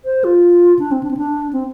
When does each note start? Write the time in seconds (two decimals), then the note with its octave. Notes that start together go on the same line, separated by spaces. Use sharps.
0.05 C5
0.24 F4
0.79 D4
0.91 C4
1.03 D4
1.11 C4
1.17 D4
1.53 C4